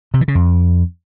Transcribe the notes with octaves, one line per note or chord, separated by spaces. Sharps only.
C3
E3
C#3
F2